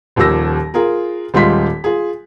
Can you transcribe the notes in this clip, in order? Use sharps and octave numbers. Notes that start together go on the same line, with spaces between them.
D#1 D#2 F3 G4 E6 A#6
F4 G#4 A#4
D#1 G3 G#3 F4 C6 B6
F4 G#4